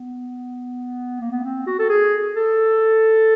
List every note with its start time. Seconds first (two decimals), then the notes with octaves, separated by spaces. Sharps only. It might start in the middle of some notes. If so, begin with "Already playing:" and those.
Already playing: B3
1.21 A#3
1.32 B3
1.43 C4
1.67 F#4
1.79 A4
1.89 G#4
2.36 A4